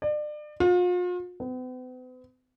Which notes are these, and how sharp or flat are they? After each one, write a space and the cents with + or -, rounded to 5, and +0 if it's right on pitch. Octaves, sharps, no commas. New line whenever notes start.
D5 +35
F4 +40
B3 +45